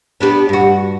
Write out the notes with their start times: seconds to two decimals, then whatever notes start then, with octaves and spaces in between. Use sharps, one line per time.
0.20 B3 D4 G4
0.49 G2 F#4